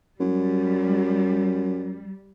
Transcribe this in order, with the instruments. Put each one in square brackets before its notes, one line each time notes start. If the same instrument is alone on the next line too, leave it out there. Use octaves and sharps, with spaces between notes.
[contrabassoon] F#2 [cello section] G3